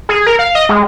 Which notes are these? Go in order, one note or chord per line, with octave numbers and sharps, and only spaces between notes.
G#4
A#4
F5
D#5
G#3